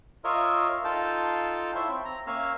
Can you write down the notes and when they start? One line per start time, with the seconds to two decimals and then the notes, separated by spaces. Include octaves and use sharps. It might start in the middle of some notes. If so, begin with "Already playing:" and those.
0.24 F4 A#4 C#5 D#5 E5
0.84 D#4 F4 A4 G5 A5
1.75 E4 C5 C#5 E5
1.89 C4
2.05 A#5
2.27 A#3 C#4 C#5 E5 F5